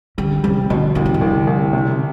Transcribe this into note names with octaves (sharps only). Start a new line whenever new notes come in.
D3 G3
C3 G3
B2 D3
C2 D3
C3
D3
C2
C2
C3